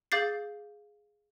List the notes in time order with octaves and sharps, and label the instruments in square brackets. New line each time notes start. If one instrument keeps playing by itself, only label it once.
[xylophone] G#4 F5 D6 G6 A6 C7